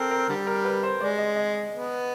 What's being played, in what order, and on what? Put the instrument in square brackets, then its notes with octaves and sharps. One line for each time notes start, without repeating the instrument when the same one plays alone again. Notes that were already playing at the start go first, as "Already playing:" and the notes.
Already playing: [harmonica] C4 [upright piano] A4 A#4
[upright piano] A#4
[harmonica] D3 G3
[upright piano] A#4
B4
C5
[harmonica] G#3 [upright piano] D5
[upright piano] D#5
D#5
[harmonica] B3